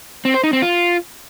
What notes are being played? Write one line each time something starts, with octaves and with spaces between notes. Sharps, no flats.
C4
C5
D#4
C4
F4